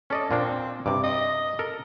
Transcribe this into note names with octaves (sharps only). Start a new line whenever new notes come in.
C#4 A4 D5 D#5
A#2 A#3 C4 D4
G2 C3 D6
D#5
A4 A#4